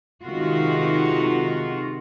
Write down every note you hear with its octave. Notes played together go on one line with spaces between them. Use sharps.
C3 D#3 G#3 F4 F#4